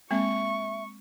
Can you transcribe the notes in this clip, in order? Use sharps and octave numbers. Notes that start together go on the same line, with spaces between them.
G#3 A#3 C4 E5 C#6